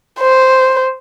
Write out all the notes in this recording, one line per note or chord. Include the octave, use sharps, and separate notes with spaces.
C5